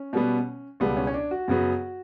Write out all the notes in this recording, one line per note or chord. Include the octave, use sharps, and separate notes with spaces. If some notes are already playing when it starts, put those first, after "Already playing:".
Already playing: C#4
B2 G3 B3
C#2 B2 G3 B3
C#4
C#4
D4
F#4
F#2 C#3 F#3 B3